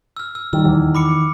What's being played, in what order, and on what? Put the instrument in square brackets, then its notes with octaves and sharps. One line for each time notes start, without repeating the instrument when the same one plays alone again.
[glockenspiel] E6 F6
E6
[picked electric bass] D#3 [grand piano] G3 [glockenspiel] E6
[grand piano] E2
[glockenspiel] B5 D6 C#7